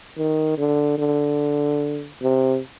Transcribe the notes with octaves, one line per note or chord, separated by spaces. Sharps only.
D#3
D3
D3
C3